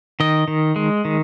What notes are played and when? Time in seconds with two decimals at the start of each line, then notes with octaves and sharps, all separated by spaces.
0.20 D#3 D#5
0.48 D#3
0.76 G#3
1.05 D#3